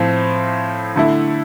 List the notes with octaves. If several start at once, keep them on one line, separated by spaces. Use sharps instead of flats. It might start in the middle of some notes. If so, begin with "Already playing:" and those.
Already playing: A2 F3 C4 F4
D3 A3 E4